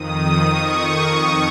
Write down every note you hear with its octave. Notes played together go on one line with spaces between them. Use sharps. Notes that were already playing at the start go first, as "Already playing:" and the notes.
Already playing: F2 D#3 D#6
C#6